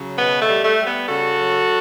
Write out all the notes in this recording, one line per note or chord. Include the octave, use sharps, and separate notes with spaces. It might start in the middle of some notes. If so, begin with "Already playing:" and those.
Already playing: C#3 F#3
B2 B3
A3
G3
A3
G3
B3
C#3 F#4 A4
F#3